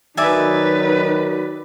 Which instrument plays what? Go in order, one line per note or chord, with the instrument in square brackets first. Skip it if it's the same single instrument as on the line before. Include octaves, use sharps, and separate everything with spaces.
[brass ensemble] D#3 F#3 [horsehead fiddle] D#4 B4 [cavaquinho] D5 E5 G#5